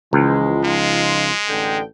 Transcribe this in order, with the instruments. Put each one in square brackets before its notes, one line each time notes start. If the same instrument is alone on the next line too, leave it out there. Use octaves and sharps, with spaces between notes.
[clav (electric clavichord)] C#2 [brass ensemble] E3 F3 G#3
[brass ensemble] F3 D#4 F4 [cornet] G#3
[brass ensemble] A1 D3 G5